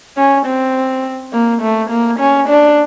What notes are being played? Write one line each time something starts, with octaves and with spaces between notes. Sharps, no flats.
C#4
C4
A#3
A3
A#3
C#4
D4